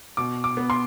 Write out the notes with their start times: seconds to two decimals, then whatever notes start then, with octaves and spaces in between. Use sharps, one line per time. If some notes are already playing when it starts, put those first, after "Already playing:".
0.17 B2 D6
0.44 D6
0.57 B3
0.70 C6